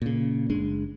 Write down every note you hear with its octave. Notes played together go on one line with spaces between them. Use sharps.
A#2 C#3
F#1 G#3 D4